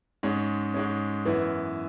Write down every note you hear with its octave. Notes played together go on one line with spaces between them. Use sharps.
G#2 G#3 C#4
G#2 G#3 C#4
F#2 E3 B3 E4